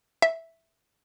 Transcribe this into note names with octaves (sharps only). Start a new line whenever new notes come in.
E5